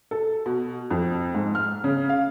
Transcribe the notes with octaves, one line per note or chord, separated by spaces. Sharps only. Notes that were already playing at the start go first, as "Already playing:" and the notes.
A4
B2
F2
G#2
F6
C#3
F5